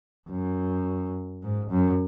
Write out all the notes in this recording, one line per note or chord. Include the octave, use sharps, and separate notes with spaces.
F#2
G#2
F#2